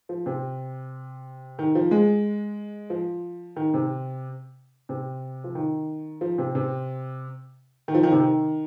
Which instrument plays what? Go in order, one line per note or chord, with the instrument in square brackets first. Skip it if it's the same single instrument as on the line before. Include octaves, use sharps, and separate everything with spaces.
[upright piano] F3
C3
D#3
F3
G#3
F3
D#3
C3
C3
F3
D#3
F3
C3
C3
D#3
F3
D#3
C3
D#3